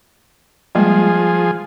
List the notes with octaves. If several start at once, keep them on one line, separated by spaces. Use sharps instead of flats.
F3 G3 G#3 A#3 G#4